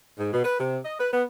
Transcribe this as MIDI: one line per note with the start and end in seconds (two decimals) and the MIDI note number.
0.19 0.30 44
0.33 0.42 47
0.45 0.56 71
0.60 0.77 48
0.85 0.98 75
0.99 1.10 71
1.12 1.24 59